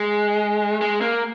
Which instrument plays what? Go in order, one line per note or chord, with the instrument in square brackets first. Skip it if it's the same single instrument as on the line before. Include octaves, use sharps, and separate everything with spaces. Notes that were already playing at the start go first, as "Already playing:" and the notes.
Already playing: [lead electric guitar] G#3
G#3
A#3